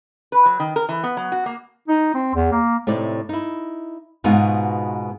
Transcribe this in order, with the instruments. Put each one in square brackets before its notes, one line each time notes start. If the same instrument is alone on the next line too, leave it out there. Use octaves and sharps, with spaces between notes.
[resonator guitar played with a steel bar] B4
F#3
D#3
A#4
E3
B3
F#3
F#4
A#3
[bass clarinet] D#4
C4
E2
A#3
[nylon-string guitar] A2 C3 D#4 D5
D#4 E4
G#2 B2 B3 D#4 F4 F#4